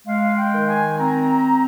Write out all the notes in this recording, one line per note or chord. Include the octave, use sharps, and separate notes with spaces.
G#3 F5
G5
D#3
G#5
C4 A#5